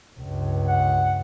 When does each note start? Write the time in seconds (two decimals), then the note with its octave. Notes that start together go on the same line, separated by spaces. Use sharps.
0.20 C#2 G2
0.67 F#5